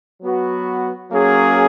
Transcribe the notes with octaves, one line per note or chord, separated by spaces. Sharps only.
F#3 B3 F#4 B4
F#3 A#3 C#4 G#4